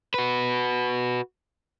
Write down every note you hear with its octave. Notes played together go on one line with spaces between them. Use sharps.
F#4 B4